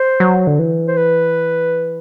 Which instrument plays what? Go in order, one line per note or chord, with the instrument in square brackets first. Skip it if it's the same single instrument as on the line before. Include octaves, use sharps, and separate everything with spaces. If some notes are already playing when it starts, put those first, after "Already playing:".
Already playing: [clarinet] C5
[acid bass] F#3
D3
E3
[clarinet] C5
B4